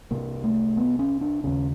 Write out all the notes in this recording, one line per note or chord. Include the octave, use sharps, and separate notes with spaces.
C2 C3 A#3
A3
B3
C#4
D4
D#2 C#3 C#4